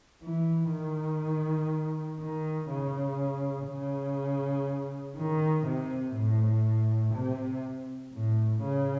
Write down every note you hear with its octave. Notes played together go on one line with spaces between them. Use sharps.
E3
D#3
D#3
C#3
C#3
D#3
C3
A2
C3
A2
C#3